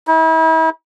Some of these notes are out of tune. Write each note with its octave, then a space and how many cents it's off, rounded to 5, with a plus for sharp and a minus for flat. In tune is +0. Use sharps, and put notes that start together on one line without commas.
E4 -40